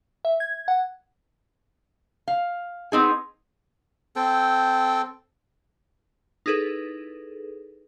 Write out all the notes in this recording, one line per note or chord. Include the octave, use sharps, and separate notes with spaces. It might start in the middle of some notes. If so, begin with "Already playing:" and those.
E5
G#6
F#5
F5
B3 C4 D#4 G#4
C4 A4 G5
D#4 E4 G#4 A4 B4